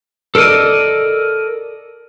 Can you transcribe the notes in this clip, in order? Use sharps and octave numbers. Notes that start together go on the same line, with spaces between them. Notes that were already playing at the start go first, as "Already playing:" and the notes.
A4 A#4 C5 D5 D#5